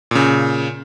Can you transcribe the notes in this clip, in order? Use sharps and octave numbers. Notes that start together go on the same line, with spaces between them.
A#2 C#3